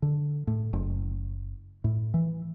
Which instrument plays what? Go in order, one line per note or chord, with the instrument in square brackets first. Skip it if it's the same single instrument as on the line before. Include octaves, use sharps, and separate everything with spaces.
[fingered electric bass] D3
A2
F#1
A2
E3